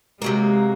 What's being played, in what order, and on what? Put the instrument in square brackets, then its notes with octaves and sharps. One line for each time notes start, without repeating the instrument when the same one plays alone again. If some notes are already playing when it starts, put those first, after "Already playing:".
[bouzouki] C3 F#3 A#3 [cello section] G#3